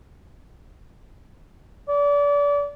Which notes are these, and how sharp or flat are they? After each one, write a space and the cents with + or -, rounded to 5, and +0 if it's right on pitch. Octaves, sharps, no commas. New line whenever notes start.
D5 -30